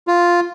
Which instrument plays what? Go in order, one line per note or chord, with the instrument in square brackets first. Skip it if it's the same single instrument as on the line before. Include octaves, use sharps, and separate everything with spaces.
[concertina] F4